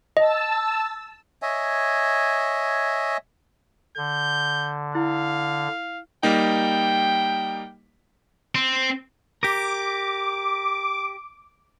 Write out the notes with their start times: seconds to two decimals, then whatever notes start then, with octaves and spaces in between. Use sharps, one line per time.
0.17 D#5 A5 E6
1.42 C#5 D#5 E5 G#5
3.97 D3 G6
4.95 E4 F5
6.23 G3 A#3 D#4 G5
8.55 C4
9.43 G4 A#4 D6